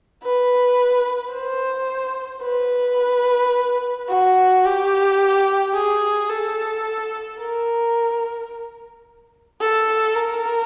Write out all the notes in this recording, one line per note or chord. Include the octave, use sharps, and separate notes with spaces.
B4
C5
B4
F#4
G4
G#4
A4
A#4
A4
A#4